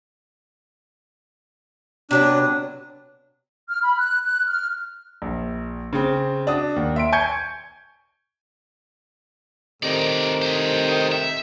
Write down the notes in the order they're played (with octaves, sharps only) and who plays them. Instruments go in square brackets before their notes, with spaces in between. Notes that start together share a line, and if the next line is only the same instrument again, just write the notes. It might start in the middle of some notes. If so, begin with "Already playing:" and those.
[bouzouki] C3 F#3 B3 [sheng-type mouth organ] D4
[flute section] F6
B5
F#6
F#6
F6
[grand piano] A#1
C#3 C4
D4 F#4 D#6
D#2
E5 C6 D7
G#5 C#6 G6 G#6 C#7
[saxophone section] A2 C3 D#3 [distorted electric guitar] D#4 D5
[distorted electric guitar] C5 D#5
E5